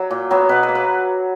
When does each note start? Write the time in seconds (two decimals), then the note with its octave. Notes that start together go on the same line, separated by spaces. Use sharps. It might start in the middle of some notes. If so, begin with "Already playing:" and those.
Already playing: F#3
0.11 A#2
0.31 F#3 B3
0.49 B2 B4
0.63 B4
0.68 A#3
0.75 B4